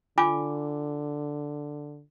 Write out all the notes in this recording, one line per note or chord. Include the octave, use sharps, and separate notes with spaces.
D3 F4 G#5 D6